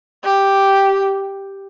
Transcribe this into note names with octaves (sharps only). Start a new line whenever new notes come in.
G4